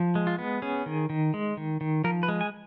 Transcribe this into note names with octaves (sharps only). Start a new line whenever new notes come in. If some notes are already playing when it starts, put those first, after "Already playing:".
Already playing: F3
G#3
F4
B3
C#4 G#4
D#3
D#3
G#3
D#3
D#3
F3 A#4
B4
G#3
G#5